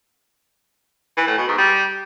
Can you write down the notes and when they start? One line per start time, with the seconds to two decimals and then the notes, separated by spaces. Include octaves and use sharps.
1.17 E3
1.27 A2
1.37 B2
1.48 G#2
1.58 G3